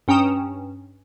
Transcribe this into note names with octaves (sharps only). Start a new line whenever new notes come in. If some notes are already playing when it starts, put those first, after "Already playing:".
G2 C#4 G5 A#5 D#6 E7